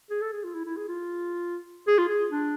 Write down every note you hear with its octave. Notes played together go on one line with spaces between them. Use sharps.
G#4
A4
G#4
F4
E4
E4
G#4
F4
G#4
F4
G#4
D4